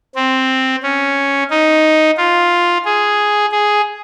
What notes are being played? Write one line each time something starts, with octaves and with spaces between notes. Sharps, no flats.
C4
C#4
D#4
F4
G#4
G#4